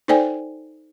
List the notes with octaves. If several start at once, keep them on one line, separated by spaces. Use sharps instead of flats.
D#4 A4 C5 D5 G5 G#5